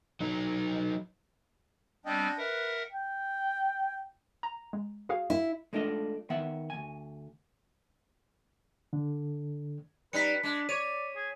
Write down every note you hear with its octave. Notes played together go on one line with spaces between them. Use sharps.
F#3 D#4
G3 B3 C4 D4 D#5 G5
A#4 B4 E5 F#5
G5
A#5
G#3
F#4 G#4 F5
E4
G#3 A3 D4 F4 D#5
D#3 B3 E5 F#5
D2 G#5
D3
G3 D#4 B4 B6 C#7
G#3 D4
C#5 D5 D#7
G#4